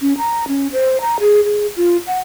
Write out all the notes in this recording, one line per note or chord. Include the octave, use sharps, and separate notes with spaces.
C#4
A#5
C#4
C5
A#5
G#4
G#4
F4
F#5